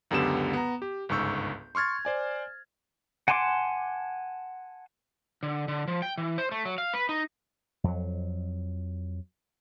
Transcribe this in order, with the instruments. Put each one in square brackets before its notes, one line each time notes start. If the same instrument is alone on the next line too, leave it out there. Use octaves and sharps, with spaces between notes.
[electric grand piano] C#2 F#2 D3 B3 G4 E7
B3 A#5
G4
G1 C#2 G#2 C#6 E6 G6
C6 C#6 F6 G#6 A6
C5 D5 G#5
[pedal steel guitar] F#5 G#5 A5 C6 D6
[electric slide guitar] D3
D3
F3
G5
E3
C5
A3
F#3
F5
B4
D#4
[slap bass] F2 F#3